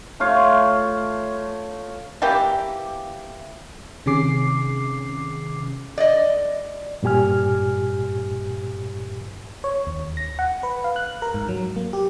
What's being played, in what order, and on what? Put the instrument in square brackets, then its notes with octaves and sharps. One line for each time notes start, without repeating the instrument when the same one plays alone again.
[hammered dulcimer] A3 F4 C#5 F5
[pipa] E3 A#3 G4
[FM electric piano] C3 D#3 C#4 G#4 D6 C7
[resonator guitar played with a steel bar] D5 D#5
[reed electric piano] G2 A#2 G4 G#5 F6
[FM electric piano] C#5
D#2
A#6
F#5
B4
F5
F#6
A#4
G#2
F#3
A#3
G4